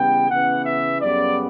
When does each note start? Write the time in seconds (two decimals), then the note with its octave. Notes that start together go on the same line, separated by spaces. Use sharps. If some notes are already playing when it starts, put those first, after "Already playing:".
Already playing: C#3 E3 G3 B3 G5
0.29 C#3 E3 B3 F#5
0.65 E5
1.01 F#2 C#3 G3 B3 D5